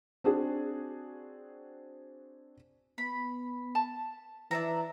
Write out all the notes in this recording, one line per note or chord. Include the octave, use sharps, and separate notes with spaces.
C4 D4 F#4 G#4
B3 B5
A5
E3 D4 E5 A#5